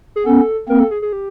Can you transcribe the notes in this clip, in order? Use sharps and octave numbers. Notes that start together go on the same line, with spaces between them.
G#4
B3 C#4 A4
A#3 C4 A#4
A4
G#4
G#4
G4